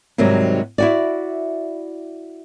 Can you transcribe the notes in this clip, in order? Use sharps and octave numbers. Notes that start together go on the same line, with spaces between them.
G#2 C3 D#3 F#3 G3
E4 F#4 D5